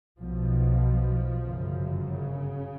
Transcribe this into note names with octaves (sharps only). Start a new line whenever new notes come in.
B1 B2 F3
G1 F#2 C#3
C#3